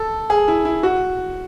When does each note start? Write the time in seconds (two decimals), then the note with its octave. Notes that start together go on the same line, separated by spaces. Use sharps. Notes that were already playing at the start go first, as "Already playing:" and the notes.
Already playing: A4
0.30 G#4
0.48 E4
0.65 E4
0.83 F#4